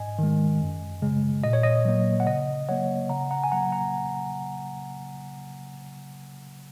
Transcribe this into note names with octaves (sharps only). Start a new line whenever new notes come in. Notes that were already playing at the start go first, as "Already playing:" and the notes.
Already playing: G#2 D#5 G#5
D#3 G#3
F#2
C#3 G#3
A#2 D#5
C#5
D#5
F#3 A#3
F#5
C#3 D#5
F#3 A#3 C#5 F#5
C#3 F#5 A#5
F#5 A#5
G#5
F#3 A#3 F#5 A#5
F#5 A#5